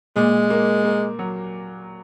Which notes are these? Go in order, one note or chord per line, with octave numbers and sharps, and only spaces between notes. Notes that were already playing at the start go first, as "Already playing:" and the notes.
A#2 G#3
A#3
A#3
F#3